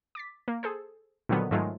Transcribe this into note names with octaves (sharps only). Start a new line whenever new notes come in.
D6 A6 B6
A#3
G#4 A4 C5
A#2 D3 D#3 F3 F#3 B3
G#2 D#3 F#3 G#3 A3 F4